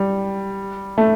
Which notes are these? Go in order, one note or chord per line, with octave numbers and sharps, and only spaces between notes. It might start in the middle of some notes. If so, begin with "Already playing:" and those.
Already playing: G3
A3